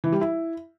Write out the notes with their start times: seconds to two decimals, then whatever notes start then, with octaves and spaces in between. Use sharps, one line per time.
0.04 E3
0.12 G3
0.21 E4